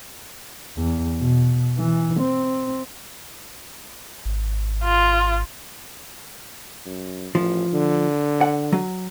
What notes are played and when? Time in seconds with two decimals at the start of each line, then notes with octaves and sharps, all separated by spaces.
0.77 E2
1.18 B2
1.78 E3
2.20 C4
4.25 G#1
4.84 F4
6.86 F#2
7.35 A1 F3
7.73 D3
8.41 F#5
8.72 F#3